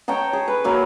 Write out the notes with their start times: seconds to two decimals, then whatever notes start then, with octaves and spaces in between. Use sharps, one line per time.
0.08 C#5 G5 A5 A#5
0.33 G#4
0.48 B4
0.64 F#3 A#3